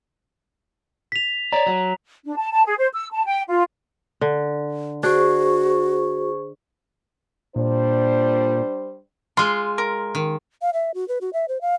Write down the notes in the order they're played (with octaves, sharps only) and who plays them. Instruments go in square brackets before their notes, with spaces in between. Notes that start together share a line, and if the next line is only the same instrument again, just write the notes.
[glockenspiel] B6 F7
[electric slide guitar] C#5 D5 [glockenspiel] A#5
[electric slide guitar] F#3
[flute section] D4
A5
A5
G#4
C5
E6
A5
G5
F4
[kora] D3
[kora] D4 [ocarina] F#4 [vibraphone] G#4 C5 C#6
[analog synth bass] A#2 [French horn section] G3 D4 C5
[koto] G#3 F4 [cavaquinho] C6
[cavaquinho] A#4
[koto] D#3
[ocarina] F5
E5
F#4
B4
F#4
E5
C5
F5